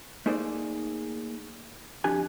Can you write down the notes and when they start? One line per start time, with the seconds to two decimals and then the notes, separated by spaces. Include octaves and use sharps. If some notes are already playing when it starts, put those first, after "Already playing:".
0.26 A3 A#3 D#4 G#4 C5 D5
2.04 F2 D4 F#4 G4 G#5